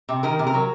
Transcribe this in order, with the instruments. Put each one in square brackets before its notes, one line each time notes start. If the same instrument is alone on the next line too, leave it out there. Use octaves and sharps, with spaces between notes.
[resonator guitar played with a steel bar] C3
D#3 A#4
C3
A#4
F#3